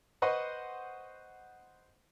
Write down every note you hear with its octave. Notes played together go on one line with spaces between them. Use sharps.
B4 C5 D#5 F#5 C6 C#6